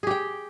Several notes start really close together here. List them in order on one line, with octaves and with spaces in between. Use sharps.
G#4 G4 G5